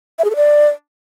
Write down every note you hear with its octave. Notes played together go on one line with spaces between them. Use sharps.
E5
G#4
A4
D5